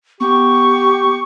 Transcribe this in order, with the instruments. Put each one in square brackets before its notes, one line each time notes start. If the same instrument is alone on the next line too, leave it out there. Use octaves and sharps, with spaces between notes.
[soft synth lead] B3 [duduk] G4 [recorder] C#6